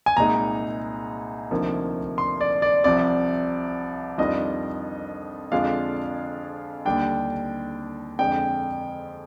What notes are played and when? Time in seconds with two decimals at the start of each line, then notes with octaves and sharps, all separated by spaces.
0.06 G#5
0.17 C2 A#2 G#3 D#4 A#5
1.51 D2 C3 F3 A#3 D#4
2.18 C6
2.41 D5
2.62 D5
2.84 C2 C3 F3 D5
4.18 F2 D#3 G3 D4 F4 D#5
5.52 F2 D3 G#3 D4 F4 F5
6.85 D#2 D3 G3 D4 G5
8.19 F2 D3 G#3 G5